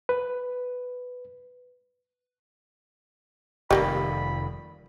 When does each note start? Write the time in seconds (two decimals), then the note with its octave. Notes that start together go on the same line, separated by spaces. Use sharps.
0.09 B4
3.71 F1 F2 D#3 G3 G#3 A#3 B5